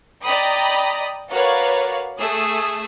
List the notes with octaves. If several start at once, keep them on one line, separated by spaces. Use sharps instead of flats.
D5 D#5 G5 A#5 B5 D#6
F#4 A#4 B4 C#5 D5 F5
A3 G#4 D#6 E6